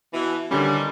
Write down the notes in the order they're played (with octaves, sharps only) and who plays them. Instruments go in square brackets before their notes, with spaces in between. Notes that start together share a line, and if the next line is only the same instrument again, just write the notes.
[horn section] B2 E3
[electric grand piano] D3 C#4 [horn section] D#3 G3